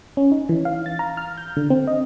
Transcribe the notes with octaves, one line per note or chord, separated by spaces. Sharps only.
C#4
D#4
E3
F5
A6
A#5
F6
G6
D3
C4
D#5